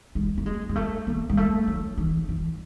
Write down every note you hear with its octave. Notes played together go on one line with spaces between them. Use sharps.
G#3
A3
G#3
G#3
A3
A#3
G#3
A3
F#3
E3
E3